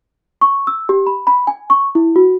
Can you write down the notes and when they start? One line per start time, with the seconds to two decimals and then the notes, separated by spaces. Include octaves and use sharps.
0.41 C#6
0.67 E6
0.89 G4
1.06 B5
1.27 B5
1.47 G#5
1.70 C#6
1.95 E4
2.16 F#4